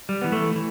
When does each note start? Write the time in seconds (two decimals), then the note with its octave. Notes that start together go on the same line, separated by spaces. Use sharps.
0.09 G3
0.22 E3 B3
0.32 A3
0.55 E3